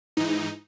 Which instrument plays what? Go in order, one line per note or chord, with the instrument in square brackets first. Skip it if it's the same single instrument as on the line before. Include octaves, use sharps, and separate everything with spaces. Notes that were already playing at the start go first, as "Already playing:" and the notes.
[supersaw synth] G#2 E3 D#4